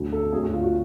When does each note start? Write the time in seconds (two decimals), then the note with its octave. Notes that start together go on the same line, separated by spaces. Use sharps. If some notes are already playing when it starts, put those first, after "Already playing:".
Already playing: D2 D3 F#3
0.12 A4
0.32 D2 D3 F#3 G#4
0.43 F#4
0.53 F4
0.63 F#4